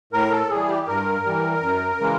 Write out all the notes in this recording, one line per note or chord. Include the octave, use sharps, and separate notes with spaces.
A2 A#4
A4
E3 G3 G#4
G4
G2 A#4
E3 G3
F#2
C#3 E3 G#3